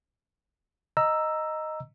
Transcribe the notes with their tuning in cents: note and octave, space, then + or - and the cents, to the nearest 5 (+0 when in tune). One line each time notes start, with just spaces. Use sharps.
D#5 +0 A#5 +0 E6 +5